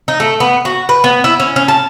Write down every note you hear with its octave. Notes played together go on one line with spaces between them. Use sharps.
D#4
A3
B3
F#4
B4
B3
E4
C#4
C#4
A5